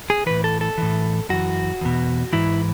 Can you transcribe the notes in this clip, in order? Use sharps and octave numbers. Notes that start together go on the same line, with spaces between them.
G#4
A2 E3 B4
A4
A4
A2 E3
F#2 E3 F#4
E2 B2
G#2 E3 E4